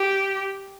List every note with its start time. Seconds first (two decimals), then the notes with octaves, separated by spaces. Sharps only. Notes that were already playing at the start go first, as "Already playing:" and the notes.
Already playing: G4